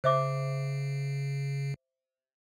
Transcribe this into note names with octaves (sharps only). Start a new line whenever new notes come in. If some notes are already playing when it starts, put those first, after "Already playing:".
C#3 C5 E5 D6